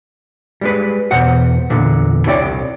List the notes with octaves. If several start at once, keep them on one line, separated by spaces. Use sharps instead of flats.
G3 G#3 B4
E2 B2 C5 F#5
E2 A#2 D3
C2 E4 C#5 D5 G5